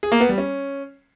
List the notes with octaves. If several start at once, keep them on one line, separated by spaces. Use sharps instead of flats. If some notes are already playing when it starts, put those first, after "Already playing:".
G#4
A#3
B3
G3
C#4